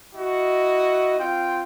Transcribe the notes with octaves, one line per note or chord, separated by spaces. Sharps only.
E4 F#4 D#5
C4 F4 G5